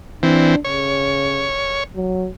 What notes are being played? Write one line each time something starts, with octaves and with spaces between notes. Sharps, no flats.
E3 C4 D4
C#3 C#5
F#3